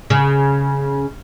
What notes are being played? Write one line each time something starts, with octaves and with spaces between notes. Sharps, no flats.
C#3